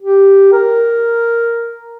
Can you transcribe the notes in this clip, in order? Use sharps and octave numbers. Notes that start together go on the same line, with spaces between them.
G4
A#4